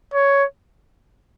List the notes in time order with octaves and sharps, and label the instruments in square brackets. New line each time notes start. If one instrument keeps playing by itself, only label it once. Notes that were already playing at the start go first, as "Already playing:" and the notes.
[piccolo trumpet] C#5